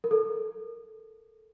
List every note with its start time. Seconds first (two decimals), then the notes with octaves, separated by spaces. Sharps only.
0.04 A#4
0.11 A4